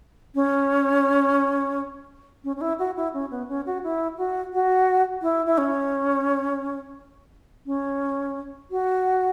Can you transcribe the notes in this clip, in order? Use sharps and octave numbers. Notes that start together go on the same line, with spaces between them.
C#4
C#4
C#4
E4
F#4
E4
C#4
B3
C#4
F#4
E4
F#4
F#4
E4
E4
C#4
C#4
F#4